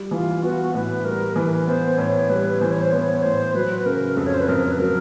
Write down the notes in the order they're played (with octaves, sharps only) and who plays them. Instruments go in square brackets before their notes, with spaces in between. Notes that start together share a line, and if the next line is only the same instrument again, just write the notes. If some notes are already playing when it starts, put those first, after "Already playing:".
Already playing: [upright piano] G3
[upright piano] E3 [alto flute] F4
[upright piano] B3 [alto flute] F#4
[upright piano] A2 [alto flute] B4
[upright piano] G3 [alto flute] A#4
[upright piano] E3 [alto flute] B4
[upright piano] B3 [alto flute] C5
[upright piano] A2 [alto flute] C#5
[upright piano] G3 [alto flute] B4
[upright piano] E3 [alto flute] C5
[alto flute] C#5
C5
[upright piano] B3 [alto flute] C#5
[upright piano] A2 [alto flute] C5
[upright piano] F#3 [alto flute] B4
[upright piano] C#3 [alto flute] A#4
[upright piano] F2 [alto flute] A4
[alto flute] C#5
C5
B4
[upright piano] F2 [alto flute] A#4
[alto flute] B4
[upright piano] F#3 [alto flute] A#4